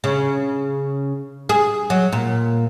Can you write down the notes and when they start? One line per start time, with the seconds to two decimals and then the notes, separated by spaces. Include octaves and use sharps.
0.04 C#3
1.49 G#4
1.90 F#3
2.12 A#2